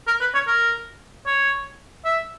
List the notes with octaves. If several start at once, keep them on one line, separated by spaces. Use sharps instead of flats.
A#4
B4
C#5
A#4
C#5
E5